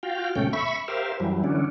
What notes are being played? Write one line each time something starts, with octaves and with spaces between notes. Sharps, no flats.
F4 F#4 F5 G5
D2 G#2 B2 A3 C#4 G5
E5 B5 C#6
G4 A#4 C5 E5 F5
F#2 E3 F#3 G3
D3 E3 C#4 D4